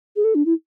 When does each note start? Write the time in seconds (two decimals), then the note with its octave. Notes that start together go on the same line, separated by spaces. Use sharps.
0.16 G#4
0.24 A4
0.35 D4
0.46 E4